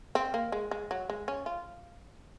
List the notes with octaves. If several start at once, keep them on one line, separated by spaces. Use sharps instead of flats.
C4
A#3
G#3
G#3
F#3
G#3
C#4
F4